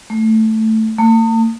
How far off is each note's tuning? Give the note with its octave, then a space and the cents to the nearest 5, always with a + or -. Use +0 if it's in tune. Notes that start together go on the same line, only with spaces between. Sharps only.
A3 +5
A3 +45